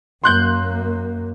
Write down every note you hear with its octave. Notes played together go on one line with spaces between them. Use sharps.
F#2 A#3 C6 F#6 G6